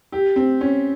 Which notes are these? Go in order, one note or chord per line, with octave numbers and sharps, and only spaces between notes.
G4
C4
C#4